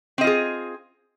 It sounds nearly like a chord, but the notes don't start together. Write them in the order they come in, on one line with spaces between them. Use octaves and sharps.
C4 D#5 F4 G#4